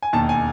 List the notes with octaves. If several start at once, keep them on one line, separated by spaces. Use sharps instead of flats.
G#5
E1 D#2 D#3 A5
G#5